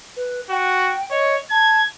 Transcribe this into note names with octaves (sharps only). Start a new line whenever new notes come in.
B4
F#4 G5
C#5 D#5
A5 G#6